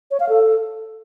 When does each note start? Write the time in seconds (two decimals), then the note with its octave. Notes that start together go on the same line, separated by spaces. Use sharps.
0.11 C#5
0.20 F5
0.29 A4